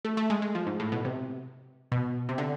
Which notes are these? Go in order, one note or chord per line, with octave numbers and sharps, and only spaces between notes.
A3
A3
G#3
G#3
F3
G#2
A2
B2
C3
B2
C3
D3